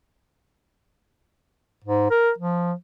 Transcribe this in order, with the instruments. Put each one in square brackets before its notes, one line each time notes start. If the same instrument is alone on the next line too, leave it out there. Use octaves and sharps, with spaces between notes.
[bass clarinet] G#2
A#4
F3